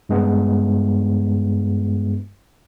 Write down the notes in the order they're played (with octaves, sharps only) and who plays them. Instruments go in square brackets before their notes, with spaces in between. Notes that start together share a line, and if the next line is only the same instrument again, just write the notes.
[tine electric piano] G2 G#3 B3